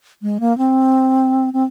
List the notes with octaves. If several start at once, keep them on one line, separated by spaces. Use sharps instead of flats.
G#3
A#3
C4
C4